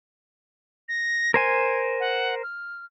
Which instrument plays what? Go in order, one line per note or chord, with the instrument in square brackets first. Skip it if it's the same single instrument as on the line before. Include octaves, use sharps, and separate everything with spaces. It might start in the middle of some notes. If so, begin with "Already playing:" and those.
[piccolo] A#6
[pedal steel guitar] A#4 C5 G#5 [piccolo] G#6
[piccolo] F#5
F6